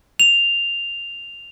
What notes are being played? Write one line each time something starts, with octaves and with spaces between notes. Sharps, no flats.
F7